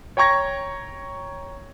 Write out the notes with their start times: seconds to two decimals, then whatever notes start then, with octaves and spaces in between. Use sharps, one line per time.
0.17 C#5 G5 A#5 C#6 G#6 A#6